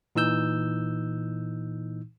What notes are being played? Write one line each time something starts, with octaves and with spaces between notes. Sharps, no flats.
A#2 E3 D#4 E6 G6